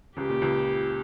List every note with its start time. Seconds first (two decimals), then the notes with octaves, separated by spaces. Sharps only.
0.17 C#2 C#3 G4
0.29 A#2
0.42 C#2 C#3